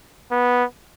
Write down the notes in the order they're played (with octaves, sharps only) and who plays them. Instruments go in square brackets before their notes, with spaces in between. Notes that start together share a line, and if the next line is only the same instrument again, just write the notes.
[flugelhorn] B3